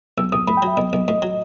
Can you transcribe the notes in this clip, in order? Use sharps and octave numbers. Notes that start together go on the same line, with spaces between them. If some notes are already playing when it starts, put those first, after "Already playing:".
B1 E6
B1 D#6
A2 B5
G5
F#3
E5
B1 D#5
B1
A2 D#5
F#3